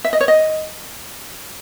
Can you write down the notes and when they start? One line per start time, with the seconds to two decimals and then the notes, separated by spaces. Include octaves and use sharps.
0.05 E5
0.13 D#5
0.21 C#5
0.28 D#5